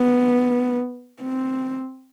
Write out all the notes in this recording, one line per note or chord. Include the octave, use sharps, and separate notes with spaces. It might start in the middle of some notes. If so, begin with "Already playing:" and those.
Already playing: B3
C4